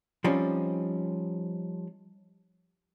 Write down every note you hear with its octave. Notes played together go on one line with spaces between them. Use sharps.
F3 G3 C4 C#4 D#4